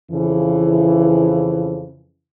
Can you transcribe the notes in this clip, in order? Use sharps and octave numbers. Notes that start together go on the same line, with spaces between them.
F2 C#3 E3